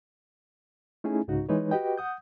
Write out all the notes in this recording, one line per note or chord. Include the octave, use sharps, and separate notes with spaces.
A3 C#4 D#4 E4 G#4 G#5
C2 G#2 C#3 D#4 F#4
E3 G#3 D#4 B4 C#5
F#4 G4 B4 D#5 G5
F#5 D#6 G6